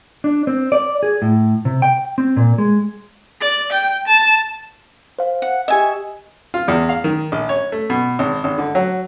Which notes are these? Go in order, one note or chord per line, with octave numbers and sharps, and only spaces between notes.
D4
C4
D5
G#4
A2
C3
G5
C4
A#2
G#3
D5
G5
A5
C5 F5
F#5
G4 D#5 E5 G#5
F4
E2
F5
D#3
A#1
C#5
A3
B2
G#1
G#1
D3
F#3